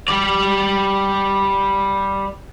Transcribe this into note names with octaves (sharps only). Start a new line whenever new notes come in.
G3 D5